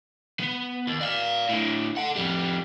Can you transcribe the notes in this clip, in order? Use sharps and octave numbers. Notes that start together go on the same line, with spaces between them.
B3
D#2
D5 F5
A2 D3
A4 F#5
F2 G3